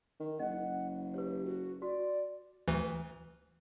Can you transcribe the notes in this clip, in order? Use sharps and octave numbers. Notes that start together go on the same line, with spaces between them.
D#3
F#1 D#5 F#5
G4 B4 C#5
F#4
F#4 D5
D2 E3